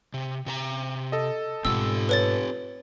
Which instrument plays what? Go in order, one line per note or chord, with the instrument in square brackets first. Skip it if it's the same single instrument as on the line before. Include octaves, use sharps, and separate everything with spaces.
[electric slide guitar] C3
C3 A#4 A#5
[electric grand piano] A4 D#5
[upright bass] G#2 B2 [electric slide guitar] C4 F4 G4 [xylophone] E6
[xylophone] B4 C#5 A6